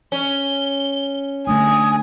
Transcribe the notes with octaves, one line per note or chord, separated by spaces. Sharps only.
C#4 G7
D3 A3 D4 G#5 D#6